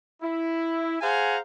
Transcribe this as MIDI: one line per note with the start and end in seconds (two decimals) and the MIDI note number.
0.22 0.96 64
1.01 1.38 68
1.01 1.38 72
1.01 1.38 77
1.01 1.38 78
1.01 1.38 80
1.01 1.38 82